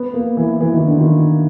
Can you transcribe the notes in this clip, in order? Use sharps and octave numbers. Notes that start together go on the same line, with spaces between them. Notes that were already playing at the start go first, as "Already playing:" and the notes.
Already playing: B3
A#3
E3
E3
D#3
D3
D#3